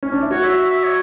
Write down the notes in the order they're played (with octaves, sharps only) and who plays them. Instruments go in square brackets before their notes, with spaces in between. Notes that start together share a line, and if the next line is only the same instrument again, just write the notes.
[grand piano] C#4
D4
E4
[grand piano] F#4 [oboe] C#5
[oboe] E5
E5
E5
C#5